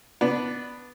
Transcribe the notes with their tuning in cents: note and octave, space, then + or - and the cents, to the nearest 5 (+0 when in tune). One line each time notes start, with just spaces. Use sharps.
B3 +0 D4 +0